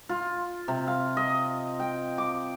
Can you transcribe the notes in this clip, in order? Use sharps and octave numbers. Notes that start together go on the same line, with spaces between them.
F4
C3
F5
D#5
G5
D6